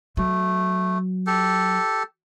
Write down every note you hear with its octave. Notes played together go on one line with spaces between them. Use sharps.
F#3 A3
G4 A4